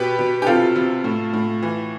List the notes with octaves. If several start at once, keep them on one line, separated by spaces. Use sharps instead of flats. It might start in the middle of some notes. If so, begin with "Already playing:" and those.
Already playing: B2 G4 B4
B2
G4
C3 F4 A4
C3
A2
A2
E3